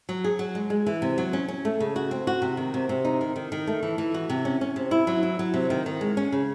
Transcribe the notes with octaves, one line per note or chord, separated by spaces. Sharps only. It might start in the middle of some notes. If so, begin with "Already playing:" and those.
F#3
G#4
F#3
G#3
G#3
E3
C3
F#3
C#4
C#4
A3
C#3
F#4
C4
F#4
C3
D#3
C3
C3
D#4
D#3
D#3
D#3
A3
E3
E3
F#4
C3
C#4
C#4
C3
E4
F#3
E4
F#3
C3
D#3
D#3
G#3
C#4
C#3